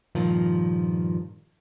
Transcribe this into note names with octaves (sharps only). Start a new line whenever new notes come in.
G2 A#2 D#3 F3